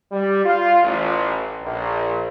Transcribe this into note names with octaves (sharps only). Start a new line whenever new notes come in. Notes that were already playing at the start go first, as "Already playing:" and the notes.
G3
F4
A1
A#1